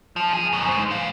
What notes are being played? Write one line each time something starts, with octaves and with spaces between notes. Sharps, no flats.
F3
G#4
F#2 B2
G#3 C5
E3 F5